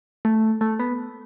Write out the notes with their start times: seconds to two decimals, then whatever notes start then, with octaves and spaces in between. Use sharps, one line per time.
0.25 A3
0.61 A3
0.79 B3